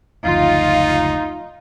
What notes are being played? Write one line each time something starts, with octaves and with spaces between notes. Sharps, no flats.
F#1 D2 F3 D#4 F4